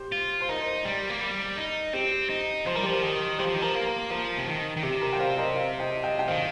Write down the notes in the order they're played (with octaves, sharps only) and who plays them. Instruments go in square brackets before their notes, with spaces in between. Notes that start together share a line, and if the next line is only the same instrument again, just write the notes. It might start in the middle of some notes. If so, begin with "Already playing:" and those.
Already playing: [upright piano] G4 C5
[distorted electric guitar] F4
[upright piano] C5
[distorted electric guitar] D#4 [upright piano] A#4
[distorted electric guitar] G3
A#3
G3
D#4
[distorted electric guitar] C4 [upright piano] G4
[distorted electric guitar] D#4
[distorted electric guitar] F3 [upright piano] C5
[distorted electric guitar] G3 [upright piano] A#4
[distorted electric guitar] F3 [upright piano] G4
[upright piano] A#4
[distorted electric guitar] D#3
[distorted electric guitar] G3 [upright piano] G4 C5
[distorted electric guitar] F3
D#3
[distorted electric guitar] F3 [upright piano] A#4
[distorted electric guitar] A#3
[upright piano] A#4
[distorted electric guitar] F3 [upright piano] A#4
[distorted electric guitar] C3
D#3
D#3
[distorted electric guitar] C3 [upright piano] G4
[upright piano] A#4
G5
C5 F5
A#4 D#5
C5 F5
D#5 G5
D#5 G5
G5
[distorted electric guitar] D#3 [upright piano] C5 F5